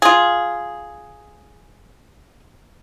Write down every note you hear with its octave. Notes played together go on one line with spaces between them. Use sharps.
F4 G#4